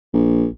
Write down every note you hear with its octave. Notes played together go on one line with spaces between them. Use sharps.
A#1